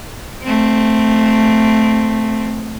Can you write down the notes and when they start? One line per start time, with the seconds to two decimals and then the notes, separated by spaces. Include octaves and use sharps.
0.43 A3 C4